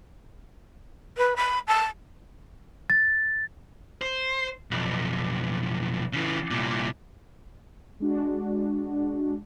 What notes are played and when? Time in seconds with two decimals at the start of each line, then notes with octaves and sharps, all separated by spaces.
1.17 B4
1.36 B5
1.67 A5
2.90 A6
4.02 C5
4.71 B1 F2
6.13 C#3 E3
6.51 C2 A#2
8.00 G#3 D4 F#4